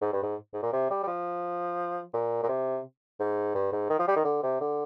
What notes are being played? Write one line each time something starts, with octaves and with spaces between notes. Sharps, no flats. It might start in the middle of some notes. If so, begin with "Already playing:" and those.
G#2
G2
G#2
G#2
A#2
C3
G3
G3
F3
A#2
A#2
C3
G#2
G2
G#2
D#3
F3
G3
D#3
D3
C3
D3